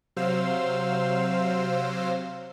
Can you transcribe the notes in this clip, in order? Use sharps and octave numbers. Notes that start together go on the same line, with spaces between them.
C3 F#3 C5 F5 E6